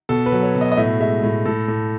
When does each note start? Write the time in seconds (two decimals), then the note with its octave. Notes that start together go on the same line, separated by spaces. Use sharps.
0.09 B2 A4
0.26 B4
0.32 F#3
0.43 C#5
0.55 B2
0.61 D#5
0.72 D#5
0.77 A2 E5
1.00 G#3 E5
1.23 A2
1.45 A2 A4
1.68 A2